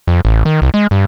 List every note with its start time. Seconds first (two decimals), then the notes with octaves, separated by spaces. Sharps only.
0.07 F2
0.25 A1
0.45 D#3
0.62 C2
0.74 G#3
0.91 G2